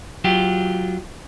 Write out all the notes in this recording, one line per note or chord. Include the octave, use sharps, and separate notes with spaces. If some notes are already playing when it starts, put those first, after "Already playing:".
F#3 F4 G4